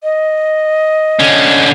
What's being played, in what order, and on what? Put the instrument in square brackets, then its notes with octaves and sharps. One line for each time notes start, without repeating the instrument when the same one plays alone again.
[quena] D#5
[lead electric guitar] D3 C#4